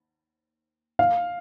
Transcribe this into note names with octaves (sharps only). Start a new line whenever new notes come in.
F5